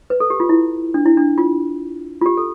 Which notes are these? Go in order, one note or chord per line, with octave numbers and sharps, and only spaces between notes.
B4
A4
G4
F4
E4
D4
E4
D4
F4
F4
G4
A4